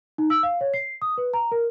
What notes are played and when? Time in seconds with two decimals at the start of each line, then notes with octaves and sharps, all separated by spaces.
0.18 D#4
0.30 E6
0.43 F5
0.61 C#5
0.74 C7
1.02 D#6
1.18 B4
1.34 A#5
1.52 A#4